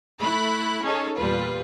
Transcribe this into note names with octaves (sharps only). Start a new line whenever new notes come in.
A3 E4 B5 F#6
C#4 D#4 G#4 A4 C#5
E2 A#2 G3 F4 B4